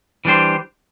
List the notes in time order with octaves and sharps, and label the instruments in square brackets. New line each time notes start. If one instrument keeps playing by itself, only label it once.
[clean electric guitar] E3 G3 D4 G4 C5